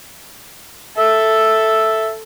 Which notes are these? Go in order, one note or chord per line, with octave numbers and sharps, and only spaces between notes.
A4 E5